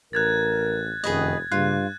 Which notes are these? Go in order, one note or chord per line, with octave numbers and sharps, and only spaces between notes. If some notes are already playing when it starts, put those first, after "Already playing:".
A1 A#4 F#6 G#6 A6
F1 F#2 D#3 G#4 B4 D#5
G2 C#3 A#3 F4 F#6